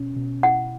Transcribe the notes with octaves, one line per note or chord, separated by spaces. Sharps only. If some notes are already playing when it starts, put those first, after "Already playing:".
Already playing: B2 C#4
B2
E4 F#5